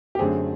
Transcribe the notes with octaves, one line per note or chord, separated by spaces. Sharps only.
G4
F#2 D3 F#3 A3 C4 G#4